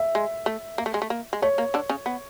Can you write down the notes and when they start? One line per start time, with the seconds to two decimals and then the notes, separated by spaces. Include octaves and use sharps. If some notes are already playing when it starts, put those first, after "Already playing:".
Already playing: E5
0.15 G#3
0.46 A3
0.78 A#3
0.86 A3
0.94 G#3
1.02 A3
1.10 A#3
1.33 G#3
1.42 A3 C#5
1.58 A#3
1.74 D3 D4
1.89 C#3 C#4
2.06 B3